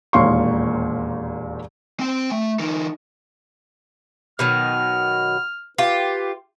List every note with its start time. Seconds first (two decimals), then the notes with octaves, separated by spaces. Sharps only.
0.13 E1 D#2 A#2 F5 C6 C#6
2.00 C4 G5
2.31 A3
2.59 E3 D#4
4.39 B2 D#3 F#3 F6
5.78 F4 G4 B4